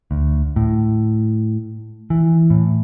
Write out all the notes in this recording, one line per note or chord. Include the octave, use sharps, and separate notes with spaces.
D2
A2
E3
A2